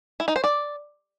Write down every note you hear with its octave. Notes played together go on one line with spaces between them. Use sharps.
E4
D#4
C5
D5